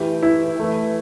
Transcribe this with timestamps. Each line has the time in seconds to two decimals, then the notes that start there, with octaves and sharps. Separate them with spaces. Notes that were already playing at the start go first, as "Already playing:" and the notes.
Already playing: E3 A3 G4
0.23 E4
0.59 E3 A3